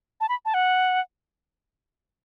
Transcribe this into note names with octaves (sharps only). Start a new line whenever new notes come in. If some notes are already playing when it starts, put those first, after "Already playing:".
A5
B5
A5
F#5